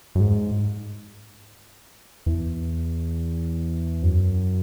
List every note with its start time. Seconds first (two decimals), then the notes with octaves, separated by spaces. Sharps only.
0.15 F#2
0.20 G#2
2.26 E2
4.02 F#2